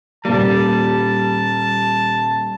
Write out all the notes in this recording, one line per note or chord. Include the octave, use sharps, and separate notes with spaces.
D#1 G3 A#3 A5